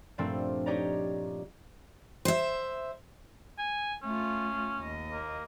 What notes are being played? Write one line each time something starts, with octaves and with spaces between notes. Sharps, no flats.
G2 A#2 F3 A3 C4 D4
D#4 G4 C#5 D5 A#5
C5 E5
G#5
A3 C#4 F4
D#2 D#5
A#3